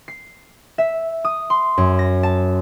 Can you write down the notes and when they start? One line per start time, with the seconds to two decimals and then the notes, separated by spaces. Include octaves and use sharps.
0.08 C7
0.78 E5
1.25 D#6
1.50 C6
1.78 F#2
1.99 A#6
2.23 A5